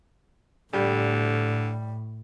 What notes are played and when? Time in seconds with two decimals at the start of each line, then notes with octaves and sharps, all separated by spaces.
0.73 A2 D3 G3